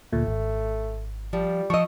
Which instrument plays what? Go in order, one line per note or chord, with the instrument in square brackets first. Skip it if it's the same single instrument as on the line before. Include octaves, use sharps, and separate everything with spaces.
[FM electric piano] D2 A#2 [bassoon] A3
[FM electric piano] G#1
[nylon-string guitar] F3 [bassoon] G3
[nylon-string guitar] F3 D#5 [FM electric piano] C#6 E6